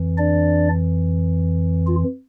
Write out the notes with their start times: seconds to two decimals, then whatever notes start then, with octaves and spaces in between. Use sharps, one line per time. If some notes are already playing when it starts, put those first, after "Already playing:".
Already playing: F2 E3
0.18 D4 D5
1.87 F4